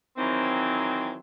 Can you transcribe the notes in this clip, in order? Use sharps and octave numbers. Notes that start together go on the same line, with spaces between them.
D#3 E3 F#3 C4